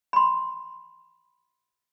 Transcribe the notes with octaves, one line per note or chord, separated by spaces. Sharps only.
B5 C6